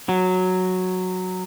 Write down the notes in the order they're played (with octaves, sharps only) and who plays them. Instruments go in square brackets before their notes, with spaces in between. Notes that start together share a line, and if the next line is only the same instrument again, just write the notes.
[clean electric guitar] F#3